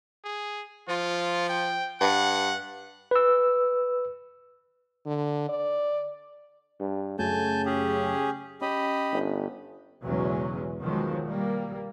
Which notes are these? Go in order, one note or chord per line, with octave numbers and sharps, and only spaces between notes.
G#4
F3 F4
G5
G2 F#5
B4 E6
D3
D5
G2
F#2 C#3 F#3 A3 G#5 A5 G6
C#4 G4 G#4
C#4 G4 D#5 B5
G1
B1 E2 C#3 F#3 G#3 C#4
B2 D#3 F3 F#3 G#3
G3 A#3